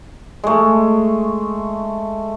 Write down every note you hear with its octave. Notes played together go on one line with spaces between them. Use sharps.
G#3 A3